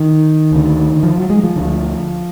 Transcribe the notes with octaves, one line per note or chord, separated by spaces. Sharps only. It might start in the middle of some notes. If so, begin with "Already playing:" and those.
Already playing: D#3
D2 D3
F3
F#3
G#3
F3
D2 D3